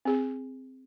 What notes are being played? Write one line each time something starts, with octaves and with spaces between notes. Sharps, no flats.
C4 G#4